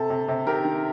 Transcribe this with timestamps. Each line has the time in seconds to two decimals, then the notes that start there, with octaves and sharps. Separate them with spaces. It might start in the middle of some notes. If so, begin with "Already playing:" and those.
Already playing: C3 A4
0.10 C3
0.28 C3
0.47 D#3 G4 A#4
0.65 D#3